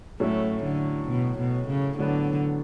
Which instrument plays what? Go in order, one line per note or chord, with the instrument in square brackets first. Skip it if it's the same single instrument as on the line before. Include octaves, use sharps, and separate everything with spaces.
[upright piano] A2 F#3 C#4 E4 [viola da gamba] A3
[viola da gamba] D3
B2
B2
C#3
[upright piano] A2 F#3 B3 D4 [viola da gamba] D3